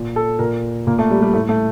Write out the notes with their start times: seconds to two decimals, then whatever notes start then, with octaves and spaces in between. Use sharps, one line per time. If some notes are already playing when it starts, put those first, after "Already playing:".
Already playing: A#2
0.16 A4
0.39 A#2 A#4
0.87 A#2 A#3
0.99 A3
1.11 G3
1.22 G3
1.33 A2 A3
1.49 A3